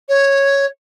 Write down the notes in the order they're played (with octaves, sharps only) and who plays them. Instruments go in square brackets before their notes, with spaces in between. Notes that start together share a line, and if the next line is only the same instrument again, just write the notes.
[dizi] C#5